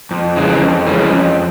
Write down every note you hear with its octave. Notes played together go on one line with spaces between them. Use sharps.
F2
C#3 E3 G#3 C#4
F2
C#3 E3 G#3 C#4
F2